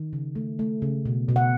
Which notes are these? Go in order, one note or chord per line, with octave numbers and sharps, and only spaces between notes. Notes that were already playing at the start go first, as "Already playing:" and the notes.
Already playing: D#3
C#3
A3
A3
C#3
B2
B2
F#5